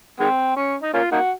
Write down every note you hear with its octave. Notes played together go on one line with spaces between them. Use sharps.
D#3 G#3 C4
C#4
D#4
A#3 C#4 F4
A#3 D#4 F#4